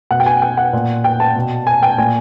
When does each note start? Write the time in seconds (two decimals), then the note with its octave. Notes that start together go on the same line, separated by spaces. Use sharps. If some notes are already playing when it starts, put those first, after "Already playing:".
0.11 B2 F#5
0.20 G5
0.26 G#5
0.42 G5
0.57 F#5
0.73 A#2
1.04 G5
1.20 A5
1.35 B2
1.67 G#5
1.83 G5
1.98 A#2 G#5